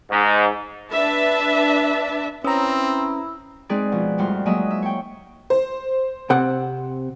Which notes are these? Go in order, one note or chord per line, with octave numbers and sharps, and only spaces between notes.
G#2
D4 B4 E5 A5
C4 C#4 E4 B4 A#5 D#6 E6
G#3 C4 D#4 G#4 B4 D5
B2 F3
F2 A2 G3 F#4 C5 F6
F#3 G#3 A#3 D#5 E5
E5
C#5 G5
C5
C3 C4 F#5